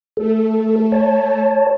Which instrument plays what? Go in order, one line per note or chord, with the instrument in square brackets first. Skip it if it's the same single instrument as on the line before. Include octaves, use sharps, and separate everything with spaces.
[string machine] A3 [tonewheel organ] A4
[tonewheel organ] C#5 A5